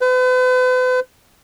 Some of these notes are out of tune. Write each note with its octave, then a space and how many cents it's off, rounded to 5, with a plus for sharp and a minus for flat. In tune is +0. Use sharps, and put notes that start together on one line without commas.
B4 +45